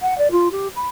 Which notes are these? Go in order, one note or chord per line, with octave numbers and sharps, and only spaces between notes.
F#5
D5
F4
G4
B5